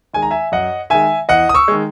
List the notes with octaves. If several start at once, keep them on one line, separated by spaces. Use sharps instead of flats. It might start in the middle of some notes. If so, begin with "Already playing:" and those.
D#3 G#3 G#5
A#5
E5 G#5
F#2 D#5 F#5
D#3 G#3 E5 G#5
E2 D#5 F#5
D#6
C#6 E6
D#3 G#3